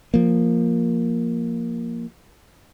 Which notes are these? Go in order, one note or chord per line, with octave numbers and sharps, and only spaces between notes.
F3 A#3